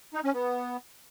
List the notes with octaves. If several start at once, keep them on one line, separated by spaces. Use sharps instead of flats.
D#4
C#4
B3